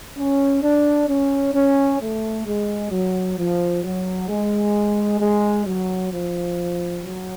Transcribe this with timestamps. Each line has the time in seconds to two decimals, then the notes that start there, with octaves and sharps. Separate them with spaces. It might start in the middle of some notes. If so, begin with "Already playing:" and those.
0.17 C#4
0.63 D4
1.08 C#4
1.54 C#4
2.01 A3
2.46 G#3
2.92 F#3
3.38 F3
3.84 F#3
4.29 G#3
5.20 G#3
5.66 F#3
6.12 F3
7.04 F#3